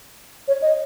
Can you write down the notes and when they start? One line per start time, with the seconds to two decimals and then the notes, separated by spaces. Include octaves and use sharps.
0.48 C#5
0.62 D#5